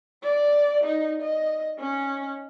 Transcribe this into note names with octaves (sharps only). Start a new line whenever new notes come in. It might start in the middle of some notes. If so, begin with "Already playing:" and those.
D5
D#4
D#5
C#4